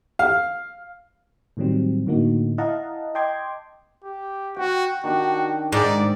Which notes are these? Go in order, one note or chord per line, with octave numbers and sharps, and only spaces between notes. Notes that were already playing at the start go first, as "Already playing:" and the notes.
F5
A2 D#3 F#3 G3 C4
A2 D3 A#3 D#4 F#4
E4 D#5 F5 F#5 A5 A#5
D#5 G5 A5 C6 D6 G#6
G4
F#4 G5 C#6
D#3 D4 F#4 G4
G#2 D5